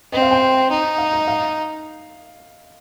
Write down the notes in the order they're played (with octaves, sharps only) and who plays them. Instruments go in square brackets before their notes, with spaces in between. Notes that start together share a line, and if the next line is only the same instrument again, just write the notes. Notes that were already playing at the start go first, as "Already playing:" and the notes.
[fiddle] C4 [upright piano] D#5
[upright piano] F5
G5
[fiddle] D#4
[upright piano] F5
D#5
F5